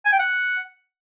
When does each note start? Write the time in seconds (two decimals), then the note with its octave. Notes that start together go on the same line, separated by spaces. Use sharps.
0.05 G#5
0.12 G5
0.19 F#5